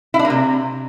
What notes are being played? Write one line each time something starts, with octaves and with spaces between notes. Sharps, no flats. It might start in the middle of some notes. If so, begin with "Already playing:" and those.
E4
D4
A#3
C3